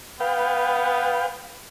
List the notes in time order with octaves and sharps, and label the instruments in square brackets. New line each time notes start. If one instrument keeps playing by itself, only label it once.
[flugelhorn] B3 [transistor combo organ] B4 F5 G5